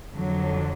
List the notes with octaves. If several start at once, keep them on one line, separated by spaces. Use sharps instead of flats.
F2 D3 F#3